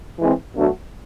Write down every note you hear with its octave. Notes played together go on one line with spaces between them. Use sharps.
E3 G#3 C4
B2 F#3 A3 D4 F#4